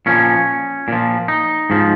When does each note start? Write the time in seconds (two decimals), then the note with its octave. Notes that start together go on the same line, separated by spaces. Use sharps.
0.06 A#2 F3 C#4
0.88 A#2 F3
1.28 D#4
1.70 G#2 F3